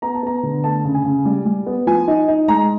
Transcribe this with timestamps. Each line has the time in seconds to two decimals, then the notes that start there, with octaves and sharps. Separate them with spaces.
0.02 B3 A#5
0.15 A5
0.23 B3 A#5
0.43 D3
0.64 A3 A5
0.85 C#3
0.95 G#5
1.05 C#3
1.25 G3
1.45 G3
1.66 B3
1.87 F3 G#5
2.08 D#4
2.28 D#4
2.48 G#3 A#5